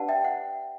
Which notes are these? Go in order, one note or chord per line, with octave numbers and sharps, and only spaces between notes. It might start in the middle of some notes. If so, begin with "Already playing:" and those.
Already playing: D4 G4 B4 D5 F#5 A5
E5 G5
F#5